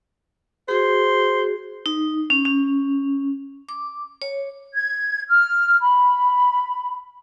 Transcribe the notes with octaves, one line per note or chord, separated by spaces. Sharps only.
F#4 G#4 C5
D#4
C#4
C#4
D6
C#5
G#6
F6
B5